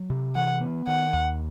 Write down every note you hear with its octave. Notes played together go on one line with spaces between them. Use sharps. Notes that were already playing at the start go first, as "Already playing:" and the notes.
Already playing: F#3
C3
E3 F#5
B3
D#3 F#5
D#2